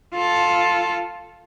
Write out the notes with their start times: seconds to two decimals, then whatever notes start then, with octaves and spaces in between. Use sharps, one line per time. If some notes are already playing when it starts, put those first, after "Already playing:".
0.14 F4 A4